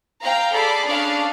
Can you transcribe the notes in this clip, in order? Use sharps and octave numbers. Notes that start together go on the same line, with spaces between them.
F5 G5 A#5
G#4 A4 D5 B5
C#4 D4 G#4 D5 F5